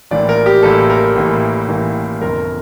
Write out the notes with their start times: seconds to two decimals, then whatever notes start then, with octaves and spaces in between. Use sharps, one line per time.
0.11 A1 A2 E3 A#3 D5
0.29 A#4
0.46 G4
0.63 A1 A2 E3 A#3 A4
0.90 A#4
1.16 A1 A2 E3 A#3
1.68 A1 A2 E3 A#3
2.21 G1 F2 C3 A#4